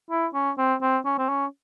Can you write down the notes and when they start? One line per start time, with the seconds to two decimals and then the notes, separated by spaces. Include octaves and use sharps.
0.10 E4
0.34 C#4
0.58 C4
0.82 C4
1.05 C#4
1.18 C4
1.29 C#4